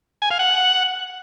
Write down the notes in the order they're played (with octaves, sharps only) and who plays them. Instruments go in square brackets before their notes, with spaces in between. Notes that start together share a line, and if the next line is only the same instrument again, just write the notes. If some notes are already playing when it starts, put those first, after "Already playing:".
[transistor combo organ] G#5
F5
F#5